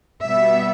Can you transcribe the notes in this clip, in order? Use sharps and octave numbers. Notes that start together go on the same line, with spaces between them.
B2 G3 B3 E5